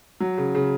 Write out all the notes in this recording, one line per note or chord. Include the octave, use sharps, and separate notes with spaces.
F#3
C#3
C#3